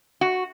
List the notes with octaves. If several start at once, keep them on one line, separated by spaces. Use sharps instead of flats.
F#4